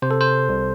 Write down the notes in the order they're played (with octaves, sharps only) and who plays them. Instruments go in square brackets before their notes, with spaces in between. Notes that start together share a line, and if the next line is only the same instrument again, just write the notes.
[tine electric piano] C3 C5
A4
C5
C2